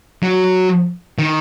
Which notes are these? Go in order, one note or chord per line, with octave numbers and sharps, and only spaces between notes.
F#3
D#3